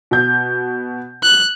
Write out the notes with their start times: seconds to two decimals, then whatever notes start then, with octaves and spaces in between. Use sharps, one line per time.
0.11 B2 G6
1.23 F#6